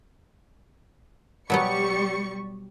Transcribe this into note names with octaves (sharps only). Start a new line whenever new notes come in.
B2 F#3 G3 B3 C#6 C#7